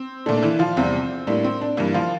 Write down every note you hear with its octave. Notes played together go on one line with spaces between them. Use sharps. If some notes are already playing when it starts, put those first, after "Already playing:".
Already playing: C4
A#2 A3 D4
D4
E3 E4
F3 F4
E2 C3 G3 C4
A2 G3 A#3 D4
C4
D4
G2 E3 A#3 E4
F3 F4